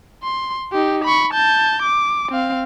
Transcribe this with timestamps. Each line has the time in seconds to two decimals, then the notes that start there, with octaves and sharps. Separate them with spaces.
0.23 C6
0.72 D#4 G4
1.04 B5 C#6
1.33 A5 G6
1.82 D6
2.31 C4 F5